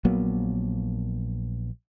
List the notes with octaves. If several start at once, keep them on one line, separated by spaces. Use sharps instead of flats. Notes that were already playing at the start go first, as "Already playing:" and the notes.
A#1 F#3 A#3 B3